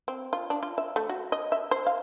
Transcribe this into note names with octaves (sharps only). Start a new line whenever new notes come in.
C4
F4
D4
F4
E5
A3
F#4
D#5
E5
C5
F5